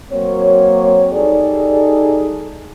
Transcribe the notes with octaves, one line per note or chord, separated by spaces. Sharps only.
F#3 A#3 C4 C#5
G3 D#4 G#4 A4 D5